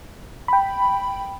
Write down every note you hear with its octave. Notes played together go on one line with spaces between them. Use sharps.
G5 B5